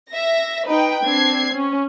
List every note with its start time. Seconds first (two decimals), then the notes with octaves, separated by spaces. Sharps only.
0.11 E5 A#6
0.67 D#4 B4 G5
1.05 C4 D4 G#6 C7
1.54 C#4